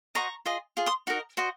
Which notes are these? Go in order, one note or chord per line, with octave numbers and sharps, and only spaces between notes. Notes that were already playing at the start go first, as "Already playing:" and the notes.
F#4 C5 D#5 A#5 C#6
F4 G#4 D#5
F4 G#4
C6 D#6
D#4 F#4 A#4 D#5
F#4 C5 D#5